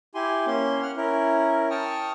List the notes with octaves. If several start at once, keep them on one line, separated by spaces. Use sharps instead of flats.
E4 G4 G#5 C6
A#3 C#4 C6
F#5 F6
C#4 E4 A#4
G5 A5 C#6 D#6 F6